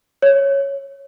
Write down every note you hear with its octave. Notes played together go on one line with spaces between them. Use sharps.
C#5